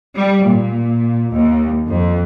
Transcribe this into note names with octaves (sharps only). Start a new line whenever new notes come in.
G3
A#2
D#2
F2